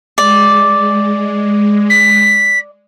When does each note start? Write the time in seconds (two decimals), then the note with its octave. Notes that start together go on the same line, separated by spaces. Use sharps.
0.18 G#3 D5
1.90 B6